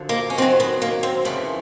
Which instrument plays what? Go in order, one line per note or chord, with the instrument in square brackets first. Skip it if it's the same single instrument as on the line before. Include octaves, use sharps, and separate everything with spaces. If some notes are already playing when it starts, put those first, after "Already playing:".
Already playing: [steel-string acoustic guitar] F#2 D3 F3
A#3
C#4
F#2 D#3 F#3 C4
B3
A#3
C4
F2 C#3 E3 B3